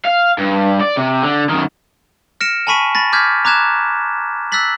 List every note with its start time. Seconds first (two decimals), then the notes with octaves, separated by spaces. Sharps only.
0.05 F5
0.38 G2
0.81 D5
0.97 C3
1.23 D3
1.49 F#2 D#3
2.41 F6 A#6 C#7 D7 E7
2.67 G#5 A5 B5 C#6 B6 D#7
2.95 B5 A6 A#6
3.12 B5 D6 F6 G6 G#6 B6
3.45 A#5 D6 F#6 G#6 E7
4.52 E6 F#6 A6 B6 F#7